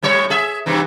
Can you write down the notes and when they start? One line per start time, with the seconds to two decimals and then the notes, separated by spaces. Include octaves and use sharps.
0.03 A2 G3 C#5
0.30 G#4 E5
0.66 G2 C3 E3